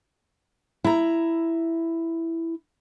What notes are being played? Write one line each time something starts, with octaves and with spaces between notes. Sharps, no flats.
E4 A#5